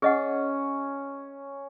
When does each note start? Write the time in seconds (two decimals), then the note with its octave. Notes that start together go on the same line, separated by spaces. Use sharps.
0.02 C#4 G#4 D#5 F#5